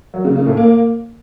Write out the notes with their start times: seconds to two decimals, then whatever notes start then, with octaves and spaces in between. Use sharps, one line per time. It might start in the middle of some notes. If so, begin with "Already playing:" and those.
0.14 F#3
0.25 C#3
0.35 C#3
0.46 A2
0.57 A#3